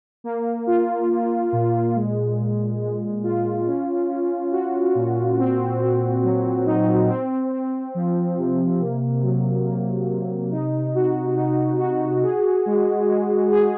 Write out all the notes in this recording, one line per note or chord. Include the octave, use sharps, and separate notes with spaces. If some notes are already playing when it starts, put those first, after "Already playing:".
A#3
F4
A#3
A#2
G#3
A#2
G#3
F4
C#4
C#4
F#4
A#2
C4
C4
F#3
D#4
C4
C4
F3
C3
A#3
F#3
A#3
C3
D#4
F#4
D#4
F#4
G#4
G#3
G#3
G#4